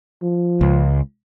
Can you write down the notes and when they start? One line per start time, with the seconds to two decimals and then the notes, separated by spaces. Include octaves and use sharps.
0.23 F3
0.61 C#2